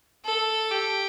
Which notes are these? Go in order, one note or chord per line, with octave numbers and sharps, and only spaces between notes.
A4
G4